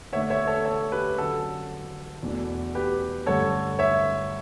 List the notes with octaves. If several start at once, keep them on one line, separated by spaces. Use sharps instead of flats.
D3 A3 D4 C#5 E5
C#5 E5
A4 C#5
A4 C#5
G4 B4
D3 F#3 C#4 A4
E2 B2 A3 D4
G4 B4
G2 D3 A3 C#4 A4 C#5
C#5 E5